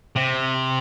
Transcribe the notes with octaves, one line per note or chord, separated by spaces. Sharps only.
C3